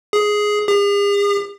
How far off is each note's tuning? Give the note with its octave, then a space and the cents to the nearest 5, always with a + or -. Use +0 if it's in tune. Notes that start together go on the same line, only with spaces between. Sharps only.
G#4 +5
G#4 -45